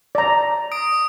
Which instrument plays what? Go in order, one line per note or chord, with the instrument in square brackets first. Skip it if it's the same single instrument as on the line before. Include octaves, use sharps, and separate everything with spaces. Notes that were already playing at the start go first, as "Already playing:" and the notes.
[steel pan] D5 A#5
[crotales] D#6 D7